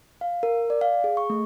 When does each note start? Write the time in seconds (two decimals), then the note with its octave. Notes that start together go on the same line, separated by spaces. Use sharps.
0.21 F5
0.43 A#4
0.70 D5
0.81 F5
1.04 G#4
1.17 C#6
1.30 A3